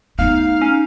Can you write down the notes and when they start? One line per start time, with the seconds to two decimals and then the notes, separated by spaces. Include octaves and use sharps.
0.19 A3 B3 D#4 F5
0.62 C#4